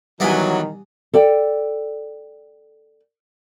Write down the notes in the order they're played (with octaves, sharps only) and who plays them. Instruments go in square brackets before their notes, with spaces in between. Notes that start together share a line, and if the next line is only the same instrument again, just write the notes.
[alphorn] D#3 [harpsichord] E3 B3 B5 [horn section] F#3 [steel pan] G3 G#5
[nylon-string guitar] A4 D5 G5